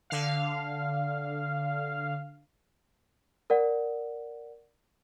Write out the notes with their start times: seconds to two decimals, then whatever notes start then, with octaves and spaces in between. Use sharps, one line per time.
0.10 D3 F5
3.50 A#4 D5 F#5